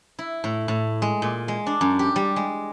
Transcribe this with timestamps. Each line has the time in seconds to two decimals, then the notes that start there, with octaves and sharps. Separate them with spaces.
0.19 E4
0.44 A2
0.68 A2
1.02 G#3
1.22 A#2
1.48 G#3
1.66 D4
1.81 F#2
1.99 G4
2.16 G3
2.36 G#3